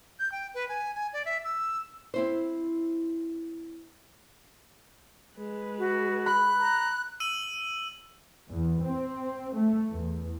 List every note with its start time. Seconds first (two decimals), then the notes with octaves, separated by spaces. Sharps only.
0.19 G6
0.32 G5
0.54 B4
0.69 G#5
0.95 G#5
1.13 D5
1.25 E5
1.44 E6
2.14 C4 E4 C5
5.38 G#3 B4
5.78 F#4
6.26 B5 F#6
6.60 A#5
7.20 E6 D#7 F#7
8.50 E2
8.84 C4
9.56 A3
9.91 E2